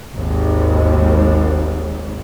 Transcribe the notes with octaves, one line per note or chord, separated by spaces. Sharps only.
G#1 D#2 G#2